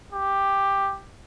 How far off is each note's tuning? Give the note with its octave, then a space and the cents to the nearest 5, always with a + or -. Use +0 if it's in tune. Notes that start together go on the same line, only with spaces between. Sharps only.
G4 +5